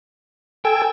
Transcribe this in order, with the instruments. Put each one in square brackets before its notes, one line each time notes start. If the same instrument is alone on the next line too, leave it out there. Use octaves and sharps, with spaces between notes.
[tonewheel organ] A4 G#5 E6 [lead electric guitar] G5